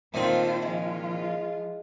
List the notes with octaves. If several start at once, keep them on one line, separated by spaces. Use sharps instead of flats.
A#2 D#3 A3 C4 F4 C5
F3 G#3 E4 F4